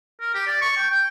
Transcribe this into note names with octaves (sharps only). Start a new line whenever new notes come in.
A#4
G4
D5
C#6
G5
G5